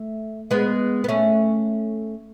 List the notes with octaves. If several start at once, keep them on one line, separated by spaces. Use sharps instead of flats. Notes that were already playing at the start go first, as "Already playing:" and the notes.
Already playing: A3
G#3 B3
B3
A3 C#4